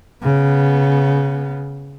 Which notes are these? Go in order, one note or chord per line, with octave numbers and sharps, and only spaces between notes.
C#3 B3